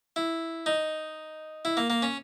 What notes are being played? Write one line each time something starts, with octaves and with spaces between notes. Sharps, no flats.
E4
D#4
E4
A#3
A#3
C#4